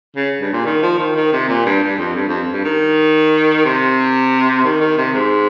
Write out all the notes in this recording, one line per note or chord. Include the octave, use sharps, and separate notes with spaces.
C#3
G2
A#2
D#3
F3
D#3
D#3
C3
A#2
G2
G2
F2
G2
F2
G2
D#3
C3
D#3
D#3
C3
G#2